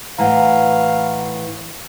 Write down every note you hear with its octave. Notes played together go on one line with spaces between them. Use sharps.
A2 E3 F5 F#5 A#5